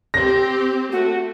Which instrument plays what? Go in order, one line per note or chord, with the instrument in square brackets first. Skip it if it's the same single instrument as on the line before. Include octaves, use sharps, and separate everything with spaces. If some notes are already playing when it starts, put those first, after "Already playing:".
[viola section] C4 G4 [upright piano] A#6
[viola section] A3 [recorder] F#4